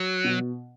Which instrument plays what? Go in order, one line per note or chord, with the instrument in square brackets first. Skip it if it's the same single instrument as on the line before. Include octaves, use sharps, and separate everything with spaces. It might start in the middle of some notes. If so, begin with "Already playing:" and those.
Already playing: [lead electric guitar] F#3
[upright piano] B2